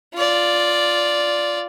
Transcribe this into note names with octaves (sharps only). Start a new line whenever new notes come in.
F4 D5